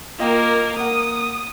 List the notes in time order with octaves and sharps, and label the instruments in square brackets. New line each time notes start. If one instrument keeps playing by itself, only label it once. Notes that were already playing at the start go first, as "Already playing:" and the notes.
[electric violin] A#3 A#4 [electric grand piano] F4 D#5 G5
[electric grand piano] A#3 A#4 F#5 [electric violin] D#6